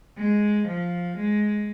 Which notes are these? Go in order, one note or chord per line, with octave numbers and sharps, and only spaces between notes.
G#3
F3
G#3